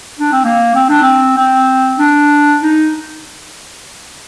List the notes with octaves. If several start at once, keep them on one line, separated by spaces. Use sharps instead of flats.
D4
C4
A#3
C4
D4
C4
C4
D4
D#4